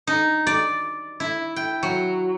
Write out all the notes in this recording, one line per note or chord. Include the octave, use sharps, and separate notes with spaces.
D#4
D5
E4
G5
F#3